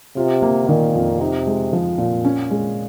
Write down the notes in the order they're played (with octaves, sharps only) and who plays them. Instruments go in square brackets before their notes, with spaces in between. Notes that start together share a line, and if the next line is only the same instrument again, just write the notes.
[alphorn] C3 [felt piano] F4
[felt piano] A#3
[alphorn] A#2 [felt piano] D#3
[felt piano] F2
[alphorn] C3 [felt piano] D#4
[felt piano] G#3
F3
A#2
C#4
G#3